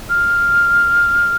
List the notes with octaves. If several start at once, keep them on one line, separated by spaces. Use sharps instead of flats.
F6